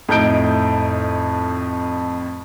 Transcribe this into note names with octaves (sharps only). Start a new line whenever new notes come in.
F2 A2 D#4 G6 D7